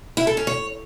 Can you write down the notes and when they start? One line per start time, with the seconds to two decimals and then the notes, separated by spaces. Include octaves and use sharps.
0.17 E4
0.27 A4
0.37 C#4
0.47 C#5